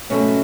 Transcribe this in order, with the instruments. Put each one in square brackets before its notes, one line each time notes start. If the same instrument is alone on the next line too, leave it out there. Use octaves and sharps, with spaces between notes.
[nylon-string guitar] E2 B2 F#3 A3 C#4